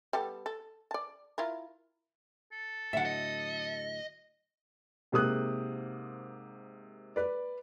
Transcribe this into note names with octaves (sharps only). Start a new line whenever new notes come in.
G3 B3 A4
A4
D5 A5
E4 F4 A#4
A4
A2 D3 F#3 E5 F#5
D#5
G#2 C3 A#3 D#6 F#6
B4 D5